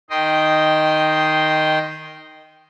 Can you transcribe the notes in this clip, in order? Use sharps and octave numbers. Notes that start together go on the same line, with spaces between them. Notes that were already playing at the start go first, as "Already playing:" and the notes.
D#3 D#5 G5 C6